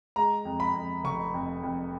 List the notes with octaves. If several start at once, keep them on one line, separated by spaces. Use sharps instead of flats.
G#3 A#5
F2
B5
F2
F1 C#6
F2
F2